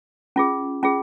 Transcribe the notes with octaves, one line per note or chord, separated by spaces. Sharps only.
C#4 F4 G#4
C#4 F4 G#4